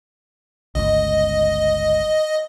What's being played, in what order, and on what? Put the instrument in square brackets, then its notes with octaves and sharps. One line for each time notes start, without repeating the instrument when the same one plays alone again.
[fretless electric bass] G1 C#2 [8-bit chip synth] D#5